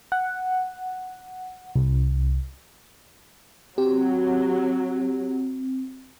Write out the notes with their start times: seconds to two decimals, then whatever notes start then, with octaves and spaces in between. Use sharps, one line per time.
0.12 F#5
1.76 C2
3.78 F#3 C4 G4